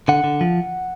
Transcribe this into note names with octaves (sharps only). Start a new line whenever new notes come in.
D3 F#5
D3
F3